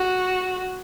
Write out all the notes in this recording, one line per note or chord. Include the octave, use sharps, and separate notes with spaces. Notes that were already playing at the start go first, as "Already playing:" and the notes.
Already playing: F#4